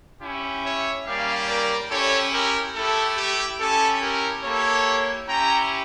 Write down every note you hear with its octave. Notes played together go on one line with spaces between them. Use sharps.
C#4 E4 G4
C#5 E5
G3 A#3 C#4 G4 D5 F5
A#4 D5
C#4 E4 G4 A4 C#5
G4 A#4
A3 E4 G4 A4
G4
C#4 E4 G4 A4
G4 A#4
A#3 E4 G4 A4 C#5
C#4 E4 G4 G5 A#5